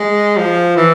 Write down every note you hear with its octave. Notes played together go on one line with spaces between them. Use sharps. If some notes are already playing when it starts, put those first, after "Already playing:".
Already playing: G#3
F3
E3